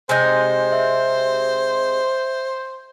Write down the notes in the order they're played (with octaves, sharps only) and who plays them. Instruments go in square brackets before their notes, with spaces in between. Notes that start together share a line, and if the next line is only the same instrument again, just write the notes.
[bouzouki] C3 G#3 D#4 [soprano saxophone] C5 [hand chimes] G#5 G6 A#6
[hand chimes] E5